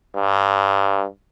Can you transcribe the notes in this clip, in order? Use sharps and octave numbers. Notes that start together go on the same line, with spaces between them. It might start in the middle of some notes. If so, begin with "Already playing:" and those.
G2